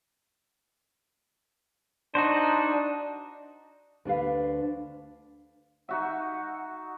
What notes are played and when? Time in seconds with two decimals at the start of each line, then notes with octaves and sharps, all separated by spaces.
2.15 D4 D#4 F#4 C5
4.05 D2 D4 B4 F5
5.89 D#4 F#4 E5 F#5